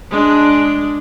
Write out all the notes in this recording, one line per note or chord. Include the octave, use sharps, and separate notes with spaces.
G#3 D4